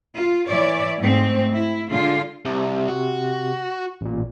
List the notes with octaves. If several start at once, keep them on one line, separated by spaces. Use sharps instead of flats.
F4
E3 C#5 D5 E5
G#2 A3 C4
E4
D3 G#3 F4
C2 C3
F#4
A1 A#2